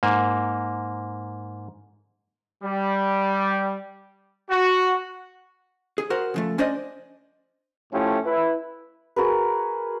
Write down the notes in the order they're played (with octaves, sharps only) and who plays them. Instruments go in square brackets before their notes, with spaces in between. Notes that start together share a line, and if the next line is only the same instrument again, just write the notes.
[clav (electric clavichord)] G#2 A#3
[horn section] G3
F#4
[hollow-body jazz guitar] G#4
F#4 A#4 C5 F#5
C#3 F3 A3
C#4 D4 C5 D5 D#5
[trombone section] A2 F3 A3 C#4 E4 G4
E4 B4
[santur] F#4 G#4 A#4 B4